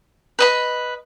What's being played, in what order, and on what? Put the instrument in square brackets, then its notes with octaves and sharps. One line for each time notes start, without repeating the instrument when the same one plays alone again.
[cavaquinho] B4 D#5 B5